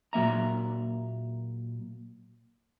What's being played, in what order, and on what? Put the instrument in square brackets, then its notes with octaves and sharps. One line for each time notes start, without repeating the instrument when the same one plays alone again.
[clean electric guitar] A#2 F#3 A#3 E5 A#5